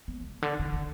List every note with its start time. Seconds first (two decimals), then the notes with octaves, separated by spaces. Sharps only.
0.08 B3
0.24 C3
0.42 D3
0.60 D3
0.74 D3